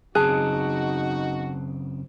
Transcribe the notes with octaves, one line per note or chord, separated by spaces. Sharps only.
F#2 C#3 C4 D#4 F#4 G#4 A5 F#6